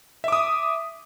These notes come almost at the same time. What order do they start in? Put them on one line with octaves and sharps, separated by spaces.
E5 D6 D#6